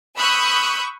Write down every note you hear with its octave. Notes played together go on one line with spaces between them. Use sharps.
B5 C#6 D#6 E6 F#6 G6